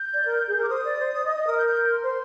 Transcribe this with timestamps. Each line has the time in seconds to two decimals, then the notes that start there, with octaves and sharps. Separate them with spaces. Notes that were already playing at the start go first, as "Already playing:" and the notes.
Already playing: G6
0.13 D5
0.25 A#4
0.48 G#4
0.58 A#4
0.63 D6
0.69 C5 D#6
0.84 D5
0.99 C5
1.13 D5
1.25 D#5
1.36 D#5
1.47 A#4
1.58 G6
1.69 G6
1.92 C6
2.03 C5